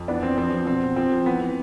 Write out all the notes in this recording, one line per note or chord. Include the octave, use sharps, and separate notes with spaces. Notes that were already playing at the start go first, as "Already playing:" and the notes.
Already playing: F2
E3 B3 D4
E3 C4
F3 C4
F3
B2 C4
B2
F3 C4
F3
E3 B3
E3